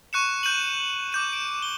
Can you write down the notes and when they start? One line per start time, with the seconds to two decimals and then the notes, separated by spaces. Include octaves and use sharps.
0.13 C#6 F#6 C#7 E7
0.43 F#6 G6 D#7 F#7
1.12 D6 G6 D#7
1.33 D7
1.62 G7